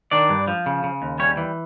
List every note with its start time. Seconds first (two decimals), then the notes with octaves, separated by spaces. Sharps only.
0.11 D#3 D4 D5
0.29 G2
0.48 F3
0.66 C#3
0.84 C#3
1.02 D#2
1.19 G3 C#4 C#5
1.37 E3